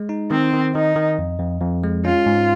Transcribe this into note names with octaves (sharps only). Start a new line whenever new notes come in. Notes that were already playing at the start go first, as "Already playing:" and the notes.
Already playing: G#3
D#4
D#3 C4
D#3
D#3 D#4
D#3
F2
F2
F2
G#3
C#4 F4
G#2